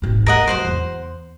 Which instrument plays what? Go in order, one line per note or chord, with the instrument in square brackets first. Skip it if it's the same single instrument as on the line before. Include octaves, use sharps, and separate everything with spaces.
[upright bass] D#1 G#1
[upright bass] G#3 [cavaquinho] A#4 D#5 F#5
[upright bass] F#3 [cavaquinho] C5 F#5 C6
[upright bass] E2